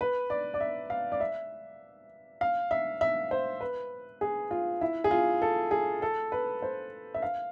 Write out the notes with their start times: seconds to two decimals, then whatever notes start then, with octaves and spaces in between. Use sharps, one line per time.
0.01 B4
0.30 D5
0.54 D5
0.61 E5
0.90 F5
1.12 D5
1.20 E5
2.41 F5
2.71 E5
3.01 E5
3.31 C5
3.61 B4
4.21 G#4
4.51 F4
4.81 E4
5.04 G#4
5.11 F4
5.42 A4
5.71 G#4
6.02 A4
6.32 B4
6.62 C5
7.14 E5
7.22 F5